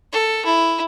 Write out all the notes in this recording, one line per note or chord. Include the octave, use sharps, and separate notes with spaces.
A4
E4